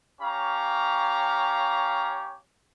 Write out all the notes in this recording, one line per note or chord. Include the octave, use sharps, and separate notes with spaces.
C#4 G4 C#5 F5 A#5